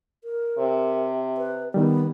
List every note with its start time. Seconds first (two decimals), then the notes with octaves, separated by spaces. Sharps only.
0.24 A#4
0.58 C3
1.37 B4
1.74 D#3 G3 B3